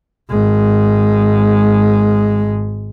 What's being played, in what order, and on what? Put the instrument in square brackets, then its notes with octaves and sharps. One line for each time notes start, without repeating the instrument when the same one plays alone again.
[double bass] G#1 G#3